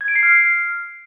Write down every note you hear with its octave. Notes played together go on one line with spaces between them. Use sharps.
G#6
D7
C7
F6